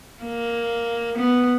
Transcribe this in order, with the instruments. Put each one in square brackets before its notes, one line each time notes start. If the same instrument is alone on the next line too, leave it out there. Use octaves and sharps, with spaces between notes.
[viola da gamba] A#3
B3